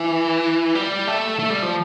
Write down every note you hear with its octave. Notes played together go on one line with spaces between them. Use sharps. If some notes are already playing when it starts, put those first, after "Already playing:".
Already playing: E3
G3
A3
A3
G3
F3